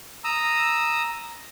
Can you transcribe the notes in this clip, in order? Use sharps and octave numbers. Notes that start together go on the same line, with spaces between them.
A#5 D#6 E6